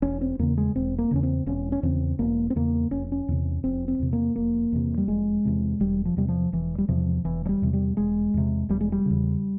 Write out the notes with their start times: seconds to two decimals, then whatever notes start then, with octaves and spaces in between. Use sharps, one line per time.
0.02 E1 C#4
0.21 C4
0.39 E2 C#3 A#3
0.57 G#3
0.75 E1 C4
0.98 A#3
1.11 E2 C#3 C#4
1.23 C4
1.46 E1 C#4
1.72 C#4
1.83 E2 C#3 C4
2.19 E1 A#3
2.50 C4
2.56 E2 C#3 A#3
2.91 F1 C#4
3.12 C#4
3.28 E2 C3
3.64 F1 C4
3.88 C4
3.99 E2 C3
4.13 A#3
4.36 F1 A#3
4.72 E2 C3
4.97 G3
5.08 F1 G#3
5.45 E2 C3
5.80 E1 G3
6.05 F3
6.17 E2 C3 G3
6.28 F3
6.53 E1 E3
6.78 G3
6.89 E2 C3 F3
7.25 E1 E3
7.45 F3
7.49 G3
7.62 E2 C3
7.73 G3
7.97 E1 G#3
8.34 E2 C3
8.69 E1 G3
8.81 G#3
8.92 G3
9.06 E2 C#3